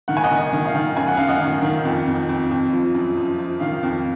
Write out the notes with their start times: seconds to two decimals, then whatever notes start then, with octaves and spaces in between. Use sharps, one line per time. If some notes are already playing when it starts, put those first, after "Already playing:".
0.08 D#3 F#5
0.17 G#5
0.24 D#5 F#5
0.30 D#3
0.37 D#5
0.53 D#3
0.66 F5
0.75 D#3
0.96 F#2 G#5
1.08 F#5
1.17 F#2 F5
1.28 D#5 F#5
1.41 D#3
1.63 D#3
1.85 F2
2.07 F2
2.29 F2
2.51 F2
2.73 F3
2.95 F#2
3.17 F3
3.38 F3
3.60 D#3 F5
3.83 F2